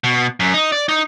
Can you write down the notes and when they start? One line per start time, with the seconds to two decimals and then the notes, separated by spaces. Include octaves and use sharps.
0.04 B2
0.40 F#2
0.54 D#4
0.72 D5
0.89 D#4